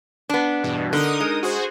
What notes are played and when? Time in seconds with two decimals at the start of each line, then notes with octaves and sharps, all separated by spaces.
0.29 B3 D4
0.63 E2 G2 B2
0.93 D3 D#4 A#4 D#6
1.20 G#3
1.43 F#4 G#4 C5